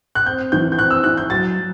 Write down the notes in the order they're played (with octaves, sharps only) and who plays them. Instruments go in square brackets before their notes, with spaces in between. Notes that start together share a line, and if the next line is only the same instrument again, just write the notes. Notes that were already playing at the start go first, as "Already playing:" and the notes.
[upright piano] F#6
[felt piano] C4 [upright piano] G6
[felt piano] E3 [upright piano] G6
[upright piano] G6
[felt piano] C4 [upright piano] F#6
[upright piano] E6
[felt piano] E4 [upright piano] F#6
[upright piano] G6
[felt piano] F#3 [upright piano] A6
[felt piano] F#3